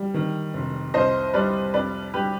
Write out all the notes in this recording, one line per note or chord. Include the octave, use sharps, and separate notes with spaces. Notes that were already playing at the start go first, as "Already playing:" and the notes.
Already playing: G3
D#3
F1
C2 C5 D#5
G3 B4 D5
F2 B4 D5
G3 G4 B4